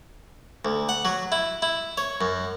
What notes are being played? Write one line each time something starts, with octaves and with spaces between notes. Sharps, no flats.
D2
F#5
F#3
E4
E4
C#5
F#2